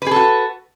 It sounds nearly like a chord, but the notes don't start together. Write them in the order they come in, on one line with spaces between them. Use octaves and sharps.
B4 G#4 A4 F#4